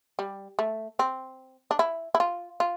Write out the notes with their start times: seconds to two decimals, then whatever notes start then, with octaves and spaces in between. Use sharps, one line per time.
0.19 G3
0.59 A3
0.99 C4
1.71 D4
1.79 E4
2.15 E4
2.20 F4
2.60 F4